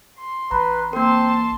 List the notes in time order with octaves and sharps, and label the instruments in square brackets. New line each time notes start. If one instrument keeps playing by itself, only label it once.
[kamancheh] C6
[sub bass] A1 [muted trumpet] B4 [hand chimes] A#5
[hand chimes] A#3 A#4 [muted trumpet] C4 [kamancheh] A5 C6